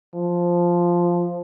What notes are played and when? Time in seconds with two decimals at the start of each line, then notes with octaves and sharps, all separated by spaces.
0.14 F3